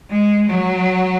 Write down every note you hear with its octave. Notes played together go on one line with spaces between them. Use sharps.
G#3
F#3